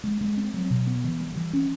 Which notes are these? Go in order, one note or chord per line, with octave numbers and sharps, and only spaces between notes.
G#3
G#3
C4
F#3
B2
B3
E3
G3
E3
C#4